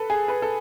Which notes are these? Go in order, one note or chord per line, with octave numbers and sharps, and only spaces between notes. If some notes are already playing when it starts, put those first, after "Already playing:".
Already playing: A4 B4
G#4
B4
A4